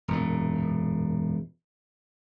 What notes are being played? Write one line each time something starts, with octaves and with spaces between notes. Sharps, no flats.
E1 F#2 A#2